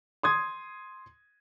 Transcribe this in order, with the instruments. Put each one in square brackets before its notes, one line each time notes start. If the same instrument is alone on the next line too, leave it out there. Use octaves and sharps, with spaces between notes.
[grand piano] C6 D#6 G#6